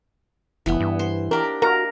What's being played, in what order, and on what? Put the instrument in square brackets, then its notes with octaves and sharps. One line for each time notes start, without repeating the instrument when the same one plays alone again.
[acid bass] F1 [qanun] E3 B3
[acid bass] G2
[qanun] C5
[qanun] D4 G4 [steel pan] A#4
[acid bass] F#4 [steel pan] A#4 [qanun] A#5